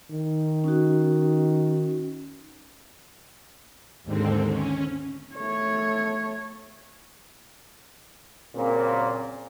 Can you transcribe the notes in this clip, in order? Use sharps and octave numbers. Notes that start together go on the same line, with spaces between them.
D#3
C#4 D#4 F#4
D#2 G#2 D3 C4
C#4
A3 C#5
A#2 C#3 F#3 A#3 C4